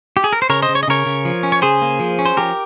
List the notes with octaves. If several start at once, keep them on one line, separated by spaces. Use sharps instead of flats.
G4
G#4
A#4
C5
C#3 A#4 C#5
C5 D#5
C#3
C#5
D#5
C#3 A#4 C#5
C#3
F3
C#4
C#5
C#3 G#4 C5
A#3
F3
C#4
C5
F3 G4 A#4